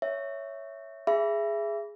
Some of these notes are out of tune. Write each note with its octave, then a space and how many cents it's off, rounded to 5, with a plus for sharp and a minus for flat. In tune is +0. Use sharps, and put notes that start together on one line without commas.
C#5 +0 E5 +0
G#4 +0 E5 +25 B5 -10